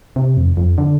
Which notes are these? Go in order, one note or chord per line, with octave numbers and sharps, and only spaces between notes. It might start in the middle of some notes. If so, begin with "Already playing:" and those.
C3
F2
F2
D3